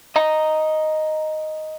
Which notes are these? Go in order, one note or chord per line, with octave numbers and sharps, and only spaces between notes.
D#5 A#5